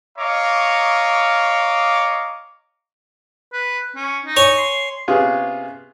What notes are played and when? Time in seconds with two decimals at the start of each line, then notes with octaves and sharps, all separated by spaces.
0.17 C#5 D#5 F5 A#5 C#6 D6
3.53 B4
3.96 C#4
4.25 D#4
4.37 C#5 G#5
4.57 C6
5.08 C3 B3 C#4 F4 G#4